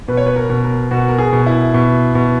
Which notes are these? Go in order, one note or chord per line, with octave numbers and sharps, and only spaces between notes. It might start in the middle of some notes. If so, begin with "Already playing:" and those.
B2 B4
C#5
B4
A#4
B2
A#4
B2 F#4
A#4
G#4
B2
E4
B2
B2